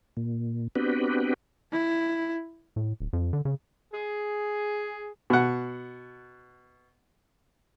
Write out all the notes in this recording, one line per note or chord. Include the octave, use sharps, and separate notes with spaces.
A#2
B3 C4 D4 F#4 G4 B4
E4
A2
D1
F2
D3
C#3
G#4
B2 F#5